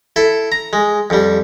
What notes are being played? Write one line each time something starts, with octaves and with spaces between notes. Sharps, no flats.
E4 A4
A#5
G#3
F2 G3